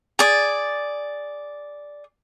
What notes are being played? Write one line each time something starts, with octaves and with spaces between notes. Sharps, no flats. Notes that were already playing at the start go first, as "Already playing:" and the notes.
G#4 D5